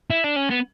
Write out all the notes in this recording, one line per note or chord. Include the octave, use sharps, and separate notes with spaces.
E4
D4
C#4
B3